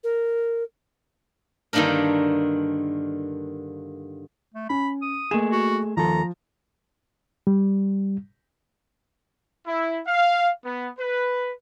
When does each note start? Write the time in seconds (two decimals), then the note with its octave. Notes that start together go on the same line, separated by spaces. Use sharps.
0.03 A#4
1.73 G2 D3 D#3 A#3 D4 A#4
4.54 A3
4.70 C#4 B5
5.02 D#6
5.31 A3 A#3 G#4 E7
5.52 F#4
5.97 D#2 F3 A4 A#5
7.47 G3
9.67 E4
10.06 F5
10.65 B3
10.99 B4